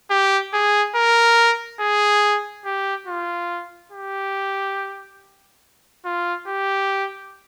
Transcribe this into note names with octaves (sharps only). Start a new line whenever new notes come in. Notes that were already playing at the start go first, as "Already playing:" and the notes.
G4
G#4
A#4
G#4
G4
F4
G4
F4
G4